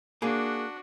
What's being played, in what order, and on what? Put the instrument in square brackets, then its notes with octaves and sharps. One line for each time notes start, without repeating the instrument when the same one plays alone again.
[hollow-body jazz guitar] A#3 G#4 [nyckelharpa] D4 F#4